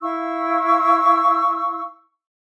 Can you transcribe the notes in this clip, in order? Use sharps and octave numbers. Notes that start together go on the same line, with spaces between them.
E4 F5 C#6 E6